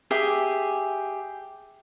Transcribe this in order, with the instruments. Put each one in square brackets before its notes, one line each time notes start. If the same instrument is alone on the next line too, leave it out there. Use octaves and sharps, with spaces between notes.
[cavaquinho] G4 G#4 E5